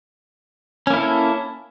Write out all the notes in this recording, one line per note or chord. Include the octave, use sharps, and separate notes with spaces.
A#3 C#4 E4 A4